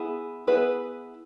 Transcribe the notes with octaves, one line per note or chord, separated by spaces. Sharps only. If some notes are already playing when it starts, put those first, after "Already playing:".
Already playing: B3 E4 G#4
B3 E4 G#4 B4